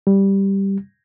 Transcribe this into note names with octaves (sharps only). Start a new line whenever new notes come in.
G3